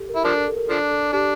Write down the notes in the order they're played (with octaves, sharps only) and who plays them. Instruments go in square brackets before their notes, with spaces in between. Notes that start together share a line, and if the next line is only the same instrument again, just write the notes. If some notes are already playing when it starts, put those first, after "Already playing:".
Already playing: [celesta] G4 A4
A#4
[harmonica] E4
[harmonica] F3 D4 [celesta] A#4
[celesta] A4
A4
A#4
[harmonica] F3 D4 [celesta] A4
[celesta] A4
[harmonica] D4 [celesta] G4